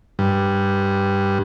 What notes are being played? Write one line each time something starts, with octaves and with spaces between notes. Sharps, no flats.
G2